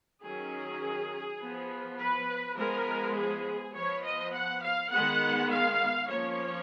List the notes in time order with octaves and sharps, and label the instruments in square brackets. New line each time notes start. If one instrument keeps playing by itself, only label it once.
[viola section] D#3 F#3 C#4 G#4
F3 B3
B4
F3 G#3 B3 A#4
G#4
F3 B3 C#5
D#5
F#5
F5
D#3 G#3 B3 F#5
F5
F3 A#3 C#4 C#5